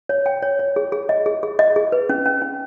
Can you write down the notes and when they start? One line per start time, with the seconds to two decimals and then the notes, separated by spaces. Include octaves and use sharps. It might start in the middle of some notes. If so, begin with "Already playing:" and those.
0.09 C#5
0.26 G5
0.42 C#5
0.59 C#5
0.76 G#4
0.92 G#4
1.09 D#5
1.26 G#4
1.43 G#4
1.59 D#5
1.76 G#4
1.92 B4
2.09 C#4
2.25 C#4
2.42 C#4